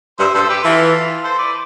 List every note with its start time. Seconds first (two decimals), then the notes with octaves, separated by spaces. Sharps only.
0.19 G2 C5 E5
0.34 G2 A4 C5
0.49 G4 B4
0.64 E3 F4 A4
1.24 A4 C5
1.38 B4 D5